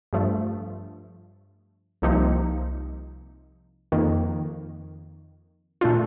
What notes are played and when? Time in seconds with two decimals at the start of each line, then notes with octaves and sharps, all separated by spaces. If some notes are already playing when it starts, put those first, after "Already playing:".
0.13 G2 F3 A3
2.02 C2 C3 F3 A#3 D#4
3.92 F2 D#3 A#3
5.81 A#2 A3 D4 F4